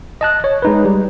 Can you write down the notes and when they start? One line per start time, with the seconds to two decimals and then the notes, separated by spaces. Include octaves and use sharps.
0.21 D#5 A5 F#6
0.44 C#5
0.62 G#3 D#4 B4
0.85 G3